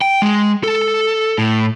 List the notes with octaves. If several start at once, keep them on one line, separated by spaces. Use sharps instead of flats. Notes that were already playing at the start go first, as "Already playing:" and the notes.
G5
G#3
A4
A2